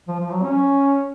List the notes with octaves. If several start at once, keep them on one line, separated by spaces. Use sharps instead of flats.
F3
F3
F#3
C#4